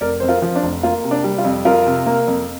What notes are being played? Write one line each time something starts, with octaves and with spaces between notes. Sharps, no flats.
F1 A#4 D5
F2 C5
F4 A#4
F3
D4
F1
A#3 F4
C3
D4
G3
F4
F2
F2 F4 A#4
C3
A#3
F2